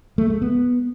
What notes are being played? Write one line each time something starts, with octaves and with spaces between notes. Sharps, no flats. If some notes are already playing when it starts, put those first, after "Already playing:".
A3
G#3
B3